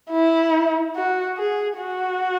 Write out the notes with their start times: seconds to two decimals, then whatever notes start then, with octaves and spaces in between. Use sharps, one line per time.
0.11 E4
0.95 F#4
1.37 G#4
1.78 F#4